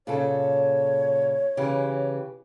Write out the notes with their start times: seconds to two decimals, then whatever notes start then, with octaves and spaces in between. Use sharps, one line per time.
0.07 A#2 C#3 A4 C#5
1.57 C#3 E3 G4